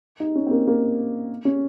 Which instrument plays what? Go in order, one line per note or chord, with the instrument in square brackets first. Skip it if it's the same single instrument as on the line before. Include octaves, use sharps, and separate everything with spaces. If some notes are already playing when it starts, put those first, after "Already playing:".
[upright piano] D#4
C#4
C4
A#3
A#3
C#4